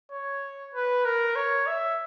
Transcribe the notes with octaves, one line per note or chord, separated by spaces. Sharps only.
C#5
B4
A#4
C#5
E5